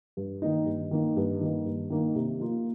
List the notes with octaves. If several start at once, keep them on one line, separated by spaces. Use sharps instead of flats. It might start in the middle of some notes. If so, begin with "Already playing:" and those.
G2
D#3 A#3 D#4
G2
D#3 A#3 D#4
G2
D#3 A#3 D#4
G2
D#3 A#3 D#4
C3
F3 A#3 F4